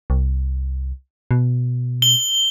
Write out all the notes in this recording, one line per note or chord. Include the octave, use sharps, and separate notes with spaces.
C2
B2
G7